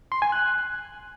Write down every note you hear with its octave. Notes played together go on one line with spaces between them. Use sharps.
C6
G#5
F#6